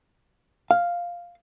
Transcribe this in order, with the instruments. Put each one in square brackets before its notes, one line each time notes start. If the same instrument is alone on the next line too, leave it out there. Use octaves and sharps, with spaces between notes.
[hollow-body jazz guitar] F5